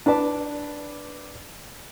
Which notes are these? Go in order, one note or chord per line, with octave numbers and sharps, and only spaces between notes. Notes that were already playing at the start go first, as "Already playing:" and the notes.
D4 B4 D5 A5